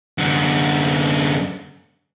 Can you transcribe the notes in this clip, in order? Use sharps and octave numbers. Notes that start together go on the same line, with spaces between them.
F#2 D3